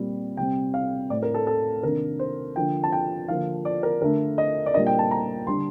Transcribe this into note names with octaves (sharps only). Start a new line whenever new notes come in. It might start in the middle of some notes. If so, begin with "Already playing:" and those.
Already playing: A#2 G3 C4
C3 G3 C4 G5
F5
A2 A3 C4 D5
A#4
A4
A4
C3 D#3 A#3 D4 A#4
C5
D3 F3 A#3 D4 G5
A5
G5
D3 F3 A#3 F5
D5
A#4
D3 A3 D4 A#4
D#5
D5
A#2 G3 A#3 D4 D#5
G5
A5
A#5
D3 G3 D4 C6